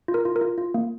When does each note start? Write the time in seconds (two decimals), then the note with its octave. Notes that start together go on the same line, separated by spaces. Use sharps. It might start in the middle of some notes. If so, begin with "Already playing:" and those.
0.08 F4
0.14 A#4
0.25 F4
0.36 A#4
0.41 F4
0.58 F4
0.74 A#3